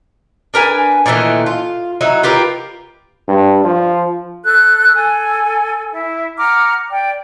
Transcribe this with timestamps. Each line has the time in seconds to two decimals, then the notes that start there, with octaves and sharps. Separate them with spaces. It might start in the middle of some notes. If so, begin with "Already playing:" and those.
0.54 D4 A#4 B4 G#5
1.06 A#2 D#3 E3 A3
1.46 F4
2.01 F#3 D#4 E4
2.23 F4 G4 A#4 B4
3.28 G2
3.64 F3
4.44 A4 F#6
4.95 A4 G#5
5.90 E4
6.37 F#5 A#5 D6 F6
6.90 D5 G5